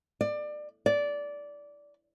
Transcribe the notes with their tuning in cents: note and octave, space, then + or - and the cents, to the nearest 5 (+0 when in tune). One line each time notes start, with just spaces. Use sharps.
D5 +25
D5 -15